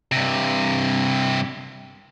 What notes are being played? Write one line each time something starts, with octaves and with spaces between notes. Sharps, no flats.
G2 C3